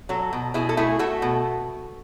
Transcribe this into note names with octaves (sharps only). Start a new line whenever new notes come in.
F#3 F#4 A4
B2
B2 E4 G#4
A4
A3 E4 G#4
A3 F#4 A4
B2